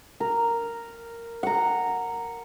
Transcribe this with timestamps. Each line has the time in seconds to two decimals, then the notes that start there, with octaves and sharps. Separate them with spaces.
0.20 A#4
1.43 F#5 A#5